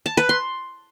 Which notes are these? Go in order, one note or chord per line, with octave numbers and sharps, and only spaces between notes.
A5
B4
C6